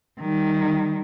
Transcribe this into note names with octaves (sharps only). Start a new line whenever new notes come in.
D#3 G3